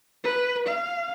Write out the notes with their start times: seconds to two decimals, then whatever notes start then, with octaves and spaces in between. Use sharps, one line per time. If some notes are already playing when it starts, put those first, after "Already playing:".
0.24 B4
0.67 F5